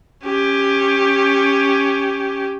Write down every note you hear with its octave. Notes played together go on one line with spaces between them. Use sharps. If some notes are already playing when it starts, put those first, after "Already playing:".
C#4 G4